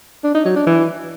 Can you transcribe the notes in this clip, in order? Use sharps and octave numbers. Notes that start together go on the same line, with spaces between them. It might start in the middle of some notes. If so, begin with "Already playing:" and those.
D4
D#4
F#3
D4
E3